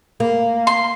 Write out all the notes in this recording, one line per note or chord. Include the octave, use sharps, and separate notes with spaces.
A#3
C6